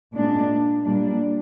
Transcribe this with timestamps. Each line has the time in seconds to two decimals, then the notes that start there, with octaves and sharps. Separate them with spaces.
0.14 A#2 G#3 D4
0.85 A#2 G3 A#3 D4